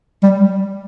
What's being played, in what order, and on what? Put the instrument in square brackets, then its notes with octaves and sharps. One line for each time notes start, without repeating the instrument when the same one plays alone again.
[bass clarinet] G3